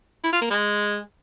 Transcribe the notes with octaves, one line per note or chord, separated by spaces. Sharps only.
E4
F4
A#3
G#3